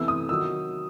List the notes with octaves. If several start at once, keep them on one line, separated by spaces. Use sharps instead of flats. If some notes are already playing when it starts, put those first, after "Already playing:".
Already playing: E2 C3 E3 A3 E6
D#6
D#3 F#3 E6